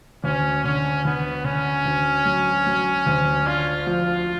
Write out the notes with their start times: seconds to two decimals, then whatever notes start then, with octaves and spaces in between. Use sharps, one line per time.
0.24 D2 C#4
0.64 D3 C#4
1.05 D2 B3
1.44 D3 C#4
1.85 D2
2.26 F#3
2.66 F#3
3.06 D2
3.46 D4 F4
3.87 F3